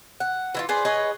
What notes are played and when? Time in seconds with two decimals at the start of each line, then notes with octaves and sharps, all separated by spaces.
0.20 F#5
0.55 E3 E4 F4
0.69 G#4 B4 C5 D5
0.85 G#4 B4 C#5 D#5